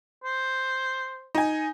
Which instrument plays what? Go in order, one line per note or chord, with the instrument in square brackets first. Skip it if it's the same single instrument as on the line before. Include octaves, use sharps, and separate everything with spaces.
[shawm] C5
[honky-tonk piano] D#4 G#5